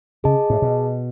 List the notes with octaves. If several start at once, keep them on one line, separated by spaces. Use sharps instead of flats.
C#3 G#4 D#5 A5
A2
B2